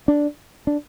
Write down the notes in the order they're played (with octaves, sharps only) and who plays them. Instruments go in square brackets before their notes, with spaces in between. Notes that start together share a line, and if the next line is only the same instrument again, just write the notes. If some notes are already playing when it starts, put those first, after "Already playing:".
[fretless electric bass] D4
D4